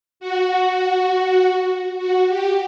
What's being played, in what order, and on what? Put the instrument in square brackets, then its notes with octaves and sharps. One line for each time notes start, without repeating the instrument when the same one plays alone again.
[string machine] F#4
F#4
G4